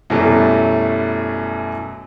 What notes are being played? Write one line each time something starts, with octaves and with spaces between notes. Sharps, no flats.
F#2 B2 E3 F#3 G3 A3